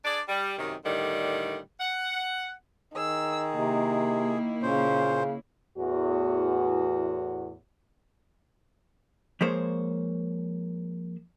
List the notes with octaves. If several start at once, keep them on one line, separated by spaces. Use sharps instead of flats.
D4 G#4 D5
G3
F#2 C3 D#3
A2 D3 D#3 G3
F#5
D#3 G#4 E6
C3 A#3 E4
A#2 C#3 C#4 C5
E2 A2 F#4
F3 G#3 A#3 G#4 C5 C#5